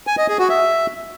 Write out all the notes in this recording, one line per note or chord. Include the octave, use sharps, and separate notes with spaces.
G#5
D#5
G#4
F#4
E5